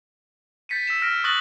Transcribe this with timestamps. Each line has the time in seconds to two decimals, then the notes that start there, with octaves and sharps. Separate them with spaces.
0.69 G6 A6 B6 C#7 D#7
0.87 E6 B6 E7
1.02 F6 A#6 B6 D7
1.24 C#6 D#6 F#6 A6 A#6 F#7